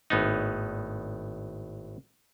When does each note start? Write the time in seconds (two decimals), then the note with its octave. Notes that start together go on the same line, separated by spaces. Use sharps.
0.10 G#1 A2 B3 D#4